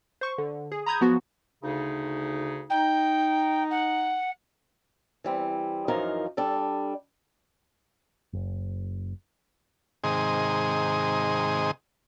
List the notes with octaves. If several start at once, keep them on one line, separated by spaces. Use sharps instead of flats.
C5 C#6
D3
G#4
A#5 B5 D#6 G6 G#6
F3 F#3 B3 F#4
D2 C#3 D#4
D#4 G5
F#5
E3 G3 C4
F#2 E3 F3 D#4 A#4 F5
G3 D4 A4
F#1
G#2 C3 D#3 G#4 C6 D#6